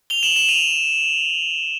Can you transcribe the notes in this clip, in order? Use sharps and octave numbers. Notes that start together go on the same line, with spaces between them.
F7 G7
E7 F#7
E7 F#7
D#7 F7